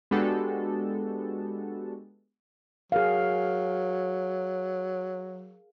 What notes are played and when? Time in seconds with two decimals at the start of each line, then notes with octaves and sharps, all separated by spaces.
0.11 G#3 B3 D4 F#4 G4 A4
2.92 F#3 G#4 A#4 F5